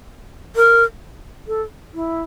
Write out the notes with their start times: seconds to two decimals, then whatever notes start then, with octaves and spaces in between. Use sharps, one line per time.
0.56 A#4
1.47 A4
1.94 E4